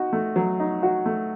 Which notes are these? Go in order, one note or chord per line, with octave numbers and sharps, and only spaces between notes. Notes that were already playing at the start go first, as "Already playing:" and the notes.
Already playing: D#4 F#4
A3
F#3
D#4
F#4
A3